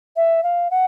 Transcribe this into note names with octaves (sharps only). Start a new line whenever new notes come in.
E5
F5
F#5